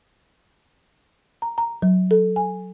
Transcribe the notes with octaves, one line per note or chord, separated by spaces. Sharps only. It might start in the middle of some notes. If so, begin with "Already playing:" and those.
A#5
A#5
F#3
A4
G#5